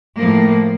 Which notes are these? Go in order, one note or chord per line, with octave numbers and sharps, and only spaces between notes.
A2 F3 A#3